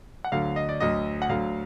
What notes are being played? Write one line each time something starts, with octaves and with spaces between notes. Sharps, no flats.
F#5
D2 D3 F#3 F5
D#5
D5
D2 D3 F#3 D#5
F#5
D2 D3 F#3 F5